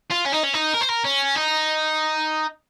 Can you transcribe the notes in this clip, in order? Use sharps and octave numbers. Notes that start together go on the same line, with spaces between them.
F4
C#4
D#4
C#4
D#4
A#4
C5
A#4
C#4
D#4